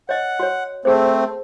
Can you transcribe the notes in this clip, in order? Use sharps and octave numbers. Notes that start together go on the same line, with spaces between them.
C#5 D#5 F#5
F#4 C#5
A3 C4 G#4 C5